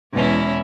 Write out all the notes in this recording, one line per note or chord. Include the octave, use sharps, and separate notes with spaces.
E2 B2 G#3 C#4 E4